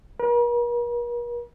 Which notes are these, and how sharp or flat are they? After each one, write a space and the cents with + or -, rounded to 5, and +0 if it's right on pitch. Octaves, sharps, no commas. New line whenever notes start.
A#4 +45